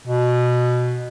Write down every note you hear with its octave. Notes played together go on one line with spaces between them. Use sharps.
B2